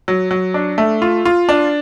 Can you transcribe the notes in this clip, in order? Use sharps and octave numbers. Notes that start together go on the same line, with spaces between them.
F#3
F#3
D4
A3
F4
F4
D4